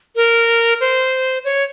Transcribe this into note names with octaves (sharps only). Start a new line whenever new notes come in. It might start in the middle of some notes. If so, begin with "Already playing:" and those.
A#4
C5
C#5